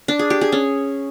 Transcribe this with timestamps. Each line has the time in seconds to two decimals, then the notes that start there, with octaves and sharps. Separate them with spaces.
0.08 D4
0.19 G#4
0.30 G4
0.41 G#4
0.52 C#4